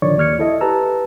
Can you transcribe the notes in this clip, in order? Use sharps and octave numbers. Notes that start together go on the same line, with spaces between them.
A#1 D3 D#3 C#5 D5 C#6
D#2 D5 F6 G#6 C#7
E4 A4 D#5 E5
G4 B4 A5 A#5 E6